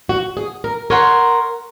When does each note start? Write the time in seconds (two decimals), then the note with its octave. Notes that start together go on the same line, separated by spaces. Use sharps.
0.09 F#4
0.37 G#4
0.64 A#4
0.90 A#4 C#5 F#5 C6